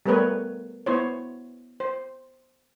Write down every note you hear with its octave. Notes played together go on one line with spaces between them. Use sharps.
G3 A3 B3 A#4 B4 C#5
B3 E4 C5 C#5
C5